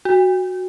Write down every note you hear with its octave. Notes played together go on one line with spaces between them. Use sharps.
F#4